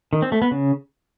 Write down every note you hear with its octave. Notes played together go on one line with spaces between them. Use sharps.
D#3
C4
A3
B3
C#3